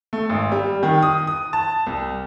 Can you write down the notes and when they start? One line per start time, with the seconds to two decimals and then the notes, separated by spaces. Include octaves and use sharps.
0.13 A3
0.29 G#1
0.52 G3
0.83 D#3
1.02 D#6
1.27 D#6
1.53 A5
1.86 C2